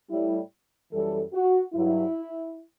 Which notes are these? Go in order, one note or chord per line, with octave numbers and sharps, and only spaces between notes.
A2 G3 E4
F#2 E3 G3 A4
F#4
G2 F#3 E4